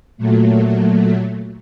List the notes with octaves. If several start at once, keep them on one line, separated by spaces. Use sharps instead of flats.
A#2 F#3 A3